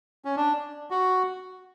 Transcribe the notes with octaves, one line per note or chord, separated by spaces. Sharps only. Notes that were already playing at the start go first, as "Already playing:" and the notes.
C#4
D4
F#4